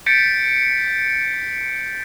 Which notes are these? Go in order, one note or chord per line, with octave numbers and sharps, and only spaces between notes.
G6 A6 B6 C#7 D7